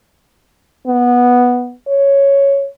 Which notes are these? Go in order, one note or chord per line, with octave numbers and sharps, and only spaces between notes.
B3
C#5